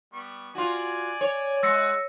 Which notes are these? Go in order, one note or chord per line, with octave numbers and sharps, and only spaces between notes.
G3 B3 C#6
F4 F#4 D5 G#5
C#5
G#3 E4 F#5 E6 A#6 C#7